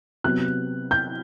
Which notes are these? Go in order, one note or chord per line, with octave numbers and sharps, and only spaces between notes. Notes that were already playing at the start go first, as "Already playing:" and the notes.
C3 F#3 B3 F#6
G6